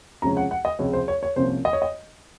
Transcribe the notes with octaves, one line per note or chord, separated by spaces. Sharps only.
C#2 C3 F3 G#3 C#4 A#5
F#5
F#5
D#5
C#2 C3 F3 G#3 C#4 C#5
C5
C#5
C#5
C2 C3 F3 A#3 C#4 C5
D#5
C#5
D#5